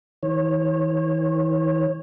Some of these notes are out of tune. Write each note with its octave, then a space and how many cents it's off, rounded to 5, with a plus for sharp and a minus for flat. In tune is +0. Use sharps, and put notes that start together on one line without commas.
E3 -45 C#5 -30